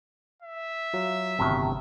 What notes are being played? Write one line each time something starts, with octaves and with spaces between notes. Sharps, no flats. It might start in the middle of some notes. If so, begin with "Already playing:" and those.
E5
F#3 F4
G1 A2 C3 D#3 F#3